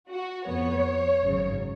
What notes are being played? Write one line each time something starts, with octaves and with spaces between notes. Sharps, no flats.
F#4
F2 F3 B3 C#5
G#1 F#2 C#3